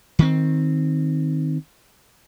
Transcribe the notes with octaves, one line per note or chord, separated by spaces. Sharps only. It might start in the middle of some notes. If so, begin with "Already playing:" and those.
D#3 C4